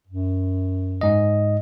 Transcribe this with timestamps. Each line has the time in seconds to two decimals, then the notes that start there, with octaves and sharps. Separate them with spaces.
0.07 F#2
1.01 G#2 D#5